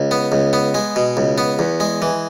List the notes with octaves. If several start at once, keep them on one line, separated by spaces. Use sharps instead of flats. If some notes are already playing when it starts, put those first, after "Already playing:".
Already playing: C#2
B3
C#2
B3
G#3
B2
C#2
B3
E2
G#3
E3